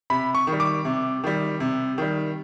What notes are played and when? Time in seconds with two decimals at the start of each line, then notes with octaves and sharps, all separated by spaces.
0.10 C3 B5
0.35 C#6
0.47 D#3
0.52 G3
0.60 D6
0.85 C3
1.24 D#3 G3
1.60 C3
1.98 D#3 G3